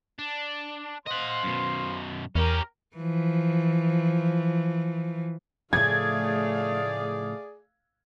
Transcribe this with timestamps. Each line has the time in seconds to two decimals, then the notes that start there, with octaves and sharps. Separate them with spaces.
0.19 D4
1.06 C5 D#5 F5 F#5 C6
1.43 F#2 B2
2.35 E2 C#4 G4 A#4
2.96 E3 F3
5.73 A2 C#3 F3 A3 G#4 D5 F5 G#6